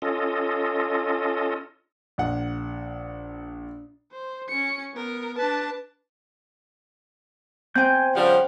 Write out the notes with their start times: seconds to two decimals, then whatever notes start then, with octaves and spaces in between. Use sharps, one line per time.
0.02 C#4 F4 A4 D#5
2.18 A#1 F#5
4.12 C5
4.48 C#4 C#7
4.94 B3 A#4
5.38 D4 B4 A5
7.75 C4 G5 G#5 G6
8.15 C#3 F3 G3 F#5